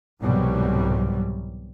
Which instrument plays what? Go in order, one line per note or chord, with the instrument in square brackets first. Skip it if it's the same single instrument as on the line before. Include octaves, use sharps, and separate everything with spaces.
[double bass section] C2 G#2 B2 E3 F#3 G3